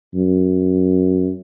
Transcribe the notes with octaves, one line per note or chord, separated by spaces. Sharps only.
F#2